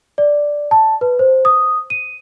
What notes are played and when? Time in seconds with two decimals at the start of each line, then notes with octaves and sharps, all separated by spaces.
0.18 D5
0.71 A5
1.01 B4
1.19 C5
1.45 D#6
1.90 D#7